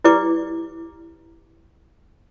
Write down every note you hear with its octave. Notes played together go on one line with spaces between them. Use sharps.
E4 G4 B4 D5 D6